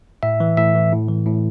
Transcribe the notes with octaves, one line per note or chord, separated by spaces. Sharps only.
A2 E5
E3
A2 E5
E3
A2
E3
A2